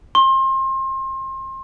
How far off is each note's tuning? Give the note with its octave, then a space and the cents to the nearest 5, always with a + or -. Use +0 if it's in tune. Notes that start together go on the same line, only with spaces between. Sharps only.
C6 +30